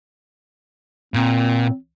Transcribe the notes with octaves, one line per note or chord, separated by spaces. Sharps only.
A#2 C4